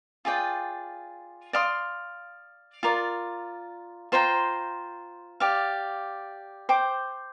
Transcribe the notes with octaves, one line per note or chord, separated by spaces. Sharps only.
F4 G#4 D5 G5
D5 F5 C6 D#6
F4 A#4 D5
F4 C5 G5 A#5
G4 D5 F5
C5 G5 D6